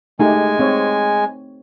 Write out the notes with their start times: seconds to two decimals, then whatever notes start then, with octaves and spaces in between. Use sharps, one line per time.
0.19 G#3 A3 D#4 G4 G#5
0.59 C4 C#5